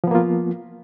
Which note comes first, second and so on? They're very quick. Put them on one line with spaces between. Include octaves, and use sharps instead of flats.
F3 B3 A#3 F4